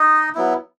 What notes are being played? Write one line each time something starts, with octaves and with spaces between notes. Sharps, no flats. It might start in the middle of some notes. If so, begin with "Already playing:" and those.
Already playing: D#4 D#5
F#3 B3 E4